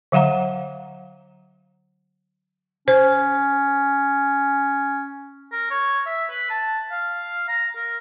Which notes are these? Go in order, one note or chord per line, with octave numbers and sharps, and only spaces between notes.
D3 F#3 F5 F#5 A#5
C#4 C5
A#4
C#5
E5
B4
A5
F5
A#5
A#4